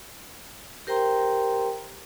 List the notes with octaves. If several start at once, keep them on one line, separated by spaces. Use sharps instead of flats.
G4 A#4 C5 G5 A#5 C6